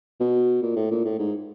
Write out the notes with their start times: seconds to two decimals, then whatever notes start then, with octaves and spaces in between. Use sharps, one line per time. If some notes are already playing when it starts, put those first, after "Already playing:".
0.20 B2
0.63 A#2
0.76 A2
0.91 A#2
1.05 A2
1.19 G#2